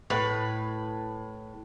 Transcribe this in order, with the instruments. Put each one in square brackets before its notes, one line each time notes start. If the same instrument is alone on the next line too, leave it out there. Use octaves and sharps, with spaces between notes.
[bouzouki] A2 B4